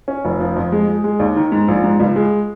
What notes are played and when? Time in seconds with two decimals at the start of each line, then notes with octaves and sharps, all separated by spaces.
0.08 C#4
0.25 F1
0.40 F3
0.56 F2
0.72 G#3
0.88 G#3
1.04 G#3
1.19 D#2
1.36 D#3
1.52 G#2
1.68 A#1
1.84 G#2
2.00 C#2
2.16 G#3